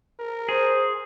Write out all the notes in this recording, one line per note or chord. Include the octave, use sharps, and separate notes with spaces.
A#4
G#4 C5